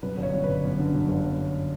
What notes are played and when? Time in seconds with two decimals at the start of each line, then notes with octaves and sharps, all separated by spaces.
0.03 F#2 B4
0.18 G1
0.23 C#5
0.33 F#2
0.44 G1 B4
0.64 F#2
0.79 D3
0.94 F#2
1.09 G1